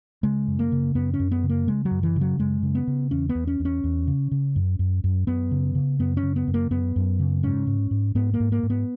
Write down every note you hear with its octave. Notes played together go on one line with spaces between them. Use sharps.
C#3 G#3
F#2
A#3
C#3
F#2 B3
C#4
F#2
B3
C#3
A#3
C#3 G#3
F#3
F#2
E3
C#3
F#3
F#2 G#3
C#3
B3
C#3
E2 C#4
B3
E2
C#4
E2
C#4
E2
C#3
C#3
F#2
F#2
F#2
F#2 B3
C#3
C#3
F#2 B3
C#4
C#3
B3
F#2
A#3
F#2 B3
F#2
C#3
G#2 C#4
G#2
G#2
G#2 B3
A#3
G#2
A#3
G#2
B3